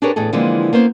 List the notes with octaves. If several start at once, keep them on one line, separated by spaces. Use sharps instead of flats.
D4 G4 G#4 A#4 B4 C#5
E2 A2 G#4 A4
D3 E3 F3 G#3 A#3 C4
A#3 B3 C#4 C5